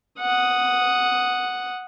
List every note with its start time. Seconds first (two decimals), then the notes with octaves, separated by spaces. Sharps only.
0.19 F#5 D#6